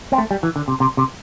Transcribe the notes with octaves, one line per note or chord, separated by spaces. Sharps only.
C4
A3
G3
E3
D3
C3
C3
C3